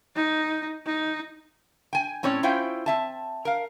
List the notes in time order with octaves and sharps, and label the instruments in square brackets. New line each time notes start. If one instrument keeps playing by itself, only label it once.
[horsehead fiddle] D#4
D#4
[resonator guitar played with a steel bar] G5 G#5
A2 C4 C#4 C#5 D5
C#4 E4 F4 C5 G5
C4 E5 A5
A#4 F5